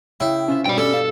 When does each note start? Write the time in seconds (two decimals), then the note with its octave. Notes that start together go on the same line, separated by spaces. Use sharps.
0.20 C#3 E4 G5
0.48 C3 C#4 F4 E5
0.66 G2 B2 D5 G5
0.78 G3 A4
0.94 F5